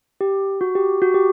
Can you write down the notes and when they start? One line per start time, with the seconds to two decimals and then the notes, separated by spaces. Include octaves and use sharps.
0.21 G4
0.61 F#4
0.75 G4
1.02 F#4
1.14 G4